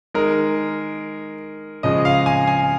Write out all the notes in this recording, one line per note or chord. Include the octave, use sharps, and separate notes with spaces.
D#3 G#3 A#4
C#3 F3 G#3 D#5
F5
G#5
G#5